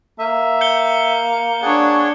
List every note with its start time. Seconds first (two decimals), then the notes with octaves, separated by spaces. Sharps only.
0.19 A#3 E5
0.61 G6 C#7 G7
1.62 D4 G#4 C#5 F#5